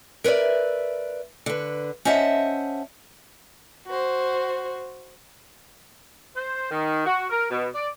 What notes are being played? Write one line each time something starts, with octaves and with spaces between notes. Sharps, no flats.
A#4 B4 C#5 D5 E5
D3 B4
C#4 C5 D#5 E5 F#5 A5
F#4 C5
C5
D#3
F#4
A#4
B2
D5